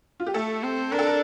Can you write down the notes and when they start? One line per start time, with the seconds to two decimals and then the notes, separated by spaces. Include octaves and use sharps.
0.20 F4
0.26 G4
0.34 A3 A4
0.63 C4
0.92 D4 A#4
0.99 A4
1.07 A#4